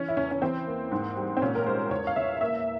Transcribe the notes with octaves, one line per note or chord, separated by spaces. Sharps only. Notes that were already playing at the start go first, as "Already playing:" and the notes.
Already playing: E3 C#4
E4
E2 C#4
C#4
E3 C4
A#3
G#2
G3
C4
A#2 C#4
A#4
G#3 C5
E2 C#5
F5
E2 E5
A#3 E5